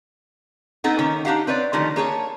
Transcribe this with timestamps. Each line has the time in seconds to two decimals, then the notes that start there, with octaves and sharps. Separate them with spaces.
0.84 B3 C4 D#4 A4 F#5
0.99 D#3 A#3 C#4 C#5
1.25 D4 D#4 G4 F5 F#5
1.47 C4 B4 C#5 D5
1.73 D3 D#3 F3 A3 G4
1.96 A#3 G#4 C#5 A5